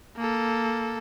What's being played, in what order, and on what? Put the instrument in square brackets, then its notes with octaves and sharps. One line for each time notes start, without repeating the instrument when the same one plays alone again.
[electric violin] A#3 A4